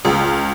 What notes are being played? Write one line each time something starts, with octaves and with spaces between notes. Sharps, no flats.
C#2